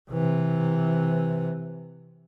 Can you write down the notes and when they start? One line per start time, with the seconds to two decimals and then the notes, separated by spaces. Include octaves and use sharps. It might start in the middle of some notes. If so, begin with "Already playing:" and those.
0.11 C3 E3